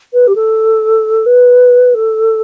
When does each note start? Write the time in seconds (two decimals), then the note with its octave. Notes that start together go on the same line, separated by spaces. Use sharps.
0.13 B4
0.27 G4
0.35 A4
1.26 B4
1.94 A4